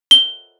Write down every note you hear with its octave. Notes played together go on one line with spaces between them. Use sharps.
G7